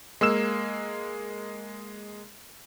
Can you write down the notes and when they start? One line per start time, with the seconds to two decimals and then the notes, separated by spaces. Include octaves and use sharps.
0.21 G#3 A#3 E6 E7